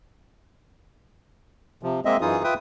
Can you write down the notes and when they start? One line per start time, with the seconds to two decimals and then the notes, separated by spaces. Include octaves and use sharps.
1.83 C3 F3
2.05 G#3 A#3 C4 D#5 E5
2.21 F#2 E3 D#4 F4 G#4 D#6
2.44 F4 B4 E5 G5 D#6